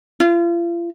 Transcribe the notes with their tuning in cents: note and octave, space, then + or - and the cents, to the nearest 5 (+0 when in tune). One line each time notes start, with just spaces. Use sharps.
F4 -40